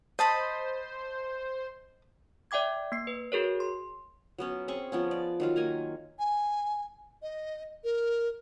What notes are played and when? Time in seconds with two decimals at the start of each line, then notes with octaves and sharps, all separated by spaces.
0.19 C5 D#5 A5 B5
2.51 D5 E5 G5 D6 G#6
2.92 A#3 C7
3.07 B4
3.32 F#4 G#4 A#4 C#5
3.60 C6
4.38 F#3 B3 C#4
4.68 C4 C#4 G#4 C#6
4.92 F3 B3 C#4
5.11 D5
5.40 D#3 F#3 F4
5.56 A#3 G#5 A#5
6.19 G#5
7.22 D#5
7.84 A#4